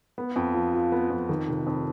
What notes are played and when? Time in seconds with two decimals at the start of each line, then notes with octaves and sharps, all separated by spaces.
0.18 B3
0.36 F2
0.54 F3
0.74 F4
0.92 B3
1.10 F2
1.29 D#3
1.48 F1
1.67 F2